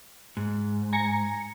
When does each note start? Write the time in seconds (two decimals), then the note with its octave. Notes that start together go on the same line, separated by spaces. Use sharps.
0.37 G#2
0.93 G#5 A#5 C#7